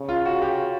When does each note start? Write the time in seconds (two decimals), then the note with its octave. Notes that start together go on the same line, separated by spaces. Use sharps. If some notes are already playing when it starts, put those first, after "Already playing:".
Already playing: C#3
0.09 F4
0.25 F#4
0.42 G4